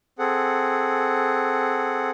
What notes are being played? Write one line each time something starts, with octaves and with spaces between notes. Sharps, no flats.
C4 G#4 A4 F#5